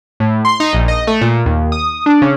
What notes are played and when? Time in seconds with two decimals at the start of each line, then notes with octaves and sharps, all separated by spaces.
0.20 A2
0.45 C6
0.60 D#4
0.73 A#1
0.88 D#5
1.07 A3
1.21 A#2
1.46 D#2
1.72 D#6
2.06 D4
2.22 C#3